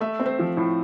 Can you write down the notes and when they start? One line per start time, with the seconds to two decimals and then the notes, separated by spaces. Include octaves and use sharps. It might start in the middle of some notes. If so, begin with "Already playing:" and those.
0.01 A3 E5
0.19 C4
0.26 C5
0.39 F3
0.57 A2